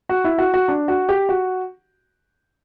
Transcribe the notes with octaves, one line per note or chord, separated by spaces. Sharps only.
F#4
E4
F#4
F#4
D4
F#4
G4
F#4